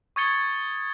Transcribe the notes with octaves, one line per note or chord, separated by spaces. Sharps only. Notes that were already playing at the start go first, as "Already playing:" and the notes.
C#6 D#6 G#6 A6 C#7 G7